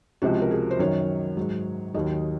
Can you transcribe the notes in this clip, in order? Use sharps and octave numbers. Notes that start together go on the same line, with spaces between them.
C#2 C3 F3 F#4
A#4
G#4
C5
F#2 D#3 F#3 C#5
G#2 F#3
D#2 D#3 F#3 D#5